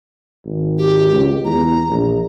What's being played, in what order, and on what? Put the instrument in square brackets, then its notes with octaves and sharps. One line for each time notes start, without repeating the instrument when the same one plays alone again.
[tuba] G#1
[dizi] G4
[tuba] C#2
[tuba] E2 [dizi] A#5
[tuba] A#1